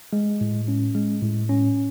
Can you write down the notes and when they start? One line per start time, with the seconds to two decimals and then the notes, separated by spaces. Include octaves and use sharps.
0.13 G#3
0.41 A2
0.68 C#4
0.95 G#3
1.22 A2
1.49 C#4